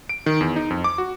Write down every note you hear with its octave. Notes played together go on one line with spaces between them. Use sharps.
D7
D#3
E2
D#4
F2
D6
F#4